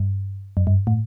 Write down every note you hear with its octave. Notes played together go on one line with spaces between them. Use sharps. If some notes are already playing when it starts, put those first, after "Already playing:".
Already playing: G2
F#2
G2
A2